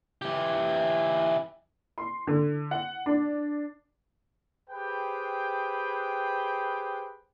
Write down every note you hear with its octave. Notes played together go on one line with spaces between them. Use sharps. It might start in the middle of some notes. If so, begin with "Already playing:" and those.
E3 G4
C6
D3
F#5
D4
G4 G#4 B4 C5 G5